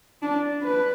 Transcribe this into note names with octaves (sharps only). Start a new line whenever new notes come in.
D4
B4